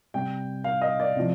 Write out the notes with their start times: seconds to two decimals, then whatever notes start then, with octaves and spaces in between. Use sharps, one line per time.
0.14 C3 G3 G5
0.64 F5
0.81 D#5
1.00 D5
1.16 C3 F3